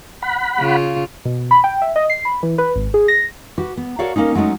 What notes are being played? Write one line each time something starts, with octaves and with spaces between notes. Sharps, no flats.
F#5 B5
C#3 F4
B2
B5
G5
E5
D#5
C7
B5
E3
B4
G#1
G#4
A#6
F#4 G4 B4
B3
F#4 A4 A#4 C#5 D5 F5
A3 A#3 C4 C#4 D#4
F#3 G#3 A3 C#4 D#4